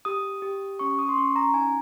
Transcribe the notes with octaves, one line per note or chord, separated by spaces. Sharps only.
G4 D#6
G4
C#4 C#6
D#6
C6
C#4 C#6
A#5
D#4 G#5